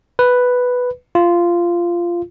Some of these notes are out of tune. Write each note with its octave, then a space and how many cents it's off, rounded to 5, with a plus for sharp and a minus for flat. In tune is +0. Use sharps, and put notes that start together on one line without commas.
B4 +0
F4 -15